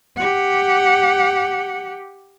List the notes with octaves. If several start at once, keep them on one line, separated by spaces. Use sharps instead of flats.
G4 F#5